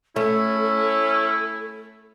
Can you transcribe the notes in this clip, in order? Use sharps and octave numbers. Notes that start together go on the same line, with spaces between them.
A3 C#4 E4 A4